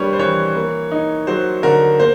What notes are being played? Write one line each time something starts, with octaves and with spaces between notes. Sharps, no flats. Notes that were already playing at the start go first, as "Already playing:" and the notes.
Already playing: G3 A#3 D4 B4 C#5
C5
E3 C#5
A#3
D#4
F#3 C5
D3 A#4
A#3 C5